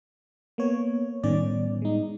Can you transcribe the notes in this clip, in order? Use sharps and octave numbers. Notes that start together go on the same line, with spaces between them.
A#3 B3 C#5
A2 D#3 G3 B3 C#4 D5
G#3 D#4